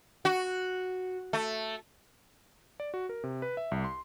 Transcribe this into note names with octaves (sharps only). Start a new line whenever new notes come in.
F#4
A3
D5
F#4
A#4
C3
B4
E5
C2
C6